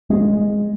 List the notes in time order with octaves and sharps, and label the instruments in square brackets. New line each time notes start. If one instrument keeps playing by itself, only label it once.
[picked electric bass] G#3